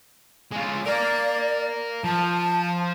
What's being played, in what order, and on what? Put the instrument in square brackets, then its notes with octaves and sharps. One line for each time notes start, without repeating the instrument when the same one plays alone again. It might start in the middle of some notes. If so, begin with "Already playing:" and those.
[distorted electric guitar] G#3 F4
[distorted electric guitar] A#4 F5 [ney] D5
[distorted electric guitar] F3 [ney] A5